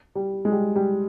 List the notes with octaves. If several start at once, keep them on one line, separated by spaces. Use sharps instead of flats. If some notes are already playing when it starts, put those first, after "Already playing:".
G3
G#3
G3
G3